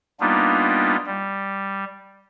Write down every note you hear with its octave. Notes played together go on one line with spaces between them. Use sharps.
G3 A#3 B3 D4 D#4 F4
G3